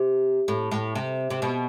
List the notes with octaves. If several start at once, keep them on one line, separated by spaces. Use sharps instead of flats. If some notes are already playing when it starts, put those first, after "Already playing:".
Already playing: C3
A2
A2
C3
C3
B2